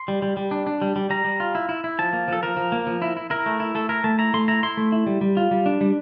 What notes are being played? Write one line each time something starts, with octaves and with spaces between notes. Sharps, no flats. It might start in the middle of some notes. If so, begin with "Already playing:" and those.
Already playing: C6
G3
G3
G3
D4
D4
G3
G3
G3 A#5
G3
F4
E4
E4
E4
F3 A5
A#3
F3 A4
F3 A#4
F3
A#3
F3
E4
E4
E4 A#4
A3
E4
A3 A4
E4 A#4
A3 A5
E4 A#5
A3 C6
E4 A#5
E4 C6
A3
E4
G3
G3
F4
G3
D4
G3